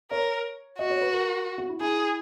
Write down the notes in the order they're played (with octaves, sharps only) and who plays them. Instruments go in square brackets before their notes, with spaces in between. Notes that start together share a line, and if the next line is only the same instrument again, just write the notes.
[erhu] A#4 [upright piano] C#5
[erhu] F#4 [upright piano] D#5
[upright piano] C#5
B4
A#4
F#4
E4
[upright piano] E4 [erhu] G#4